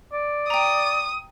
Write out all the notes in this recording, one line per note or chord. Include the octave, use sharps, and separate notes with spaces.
D5
G5 A#5 D#6